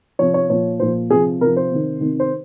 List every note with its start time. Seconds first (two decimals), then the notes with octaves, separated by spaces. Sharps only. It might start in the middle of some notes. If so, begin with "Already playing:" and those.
0.19 C3 F3 C#5
0.34 C#5
0.49 A#2 F3 C#5
0.79 A#2 F3 C5
1.10 C3 F3 G#4
1.41 C3 F3 A#4
1.56 C5
1.71 C3 D#3
2.01 C3 D#3
2.20 C5